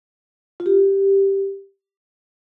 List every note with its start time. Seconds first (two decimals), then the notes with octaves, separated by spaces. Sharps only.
0.60 F4
0.66 G4